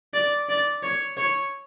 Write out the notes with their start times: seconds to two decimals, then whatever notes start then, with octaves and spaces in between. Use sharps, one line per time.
0.14 D5
0.49 D5
0.83 C#5
1.17 C#5